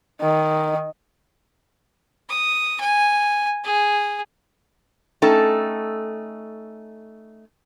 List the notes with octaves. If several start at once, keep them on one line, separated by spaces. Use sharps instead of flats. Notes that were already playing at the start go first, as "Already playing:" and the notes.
D#3
D#6
G#5
G#4
A3 C#4 D#4 A4 G5